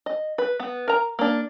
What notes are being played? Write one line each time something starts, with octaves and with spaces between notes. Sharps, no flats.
D#5
B4
B3
A#4 A#5
A#3 D4